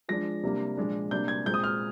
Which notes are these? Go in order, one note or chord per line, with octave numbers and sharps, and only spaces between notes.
F3 G#3 D4 A#6
C3 G3 A#3 D4
A#2 F3 G#3 D4
C3 G3 A#3 D4 G6
G#6
A#2 G#3 C4 G6
D#6
F6